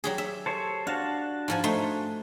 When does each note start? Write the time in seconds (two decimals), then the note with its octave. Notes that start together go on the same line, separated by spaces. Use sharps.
0.04 F#3 G4 G#4
0.18 E5
0.46 A4 C5 C#5
0.87 D4 F#4 F5 A5
1.48 G#2 F3 G#5
1.64 A3 D#4 C6